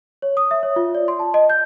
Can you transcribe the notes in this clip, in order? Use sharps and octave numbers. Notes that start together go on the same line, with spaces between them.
C#5
D#6
E5
C#5
F4
D5
C6
A5
D#5
G6